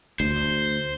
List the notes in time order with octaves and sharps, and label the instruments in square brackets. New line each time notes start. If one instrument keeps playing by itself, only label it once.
[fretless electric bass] D2 [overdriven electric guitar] C5